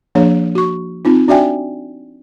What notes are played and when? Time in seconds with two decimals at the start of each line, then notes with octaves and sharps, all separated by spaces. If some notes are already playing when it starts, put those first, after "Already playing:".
0.15 F3 A#3 D4 G#4 C#5
0.55 F#4 C#6
1.05 C4 D#4 F4
1.28 D4 F#4 D5 E5 G5 G#5